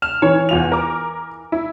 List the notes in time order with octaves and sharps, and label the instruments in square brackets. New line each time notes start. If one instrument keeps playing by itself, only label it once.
[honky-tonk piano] F6 E7
[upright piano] E3 [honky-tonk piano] C#5
[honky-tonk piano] E2 F4 F7
A#4 D6
E4